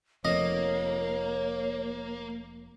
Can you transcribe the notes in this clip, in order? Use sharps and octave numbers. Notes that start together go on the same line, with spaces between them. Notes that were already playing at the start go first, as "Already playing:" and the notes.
F1 F2 A#3 C#5 D#5